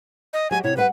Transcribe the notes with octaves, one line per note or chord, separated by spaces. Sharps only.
D#5
F#3 G4 D#5 G#5
C3 E4 C#5
G3 B4 F5 F#5